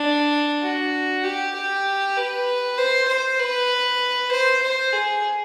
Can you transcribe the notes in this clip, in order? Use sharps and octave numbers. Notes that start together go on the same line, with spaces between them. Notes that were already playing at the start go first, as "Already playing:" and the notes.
Already playing: D4
F#4
G4
G4
B4
C5
C5
B4
C5
C5
G#4